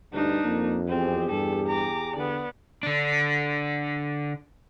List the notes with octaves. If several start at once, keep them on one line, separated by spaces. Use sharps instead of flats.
D2 G2 D4 D#4
F2 A#3
E2 C4 G4 G#4
G2 A4
A#5 D6
D3 B3 D5
D3 D4